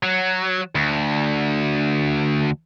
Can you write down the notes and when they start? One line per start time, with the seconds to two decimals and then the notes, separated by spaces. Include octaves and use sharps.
0.03 F#3
0.75 D2